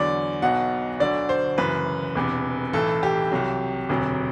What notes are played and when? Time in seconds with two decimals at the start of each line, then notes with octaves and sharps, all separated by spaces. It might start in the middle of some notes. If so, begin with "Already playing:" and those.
Already playing: E2 D3 F#3 D5
0.42 B1 B2 F#3 F#5
1.00 D2 D3 F#3 D5
1.29 C5
1.58 F#1 F#2 E3 B4
2.15 E1 E2 C3
2.73 B1 A2 E3 A4
3.03 G4
3.32 C2 C3 F#3
3.89 E1 D2 C3 F#3